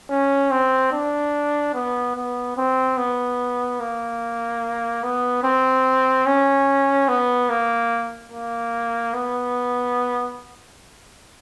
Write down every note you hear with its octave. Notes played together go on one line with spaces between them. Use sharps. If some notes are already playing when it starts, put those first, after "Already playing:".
C#4
C4
D4
B3
B3
C4
B3
A#3
B3
C4
C#4
B3
A#3
A#3
B3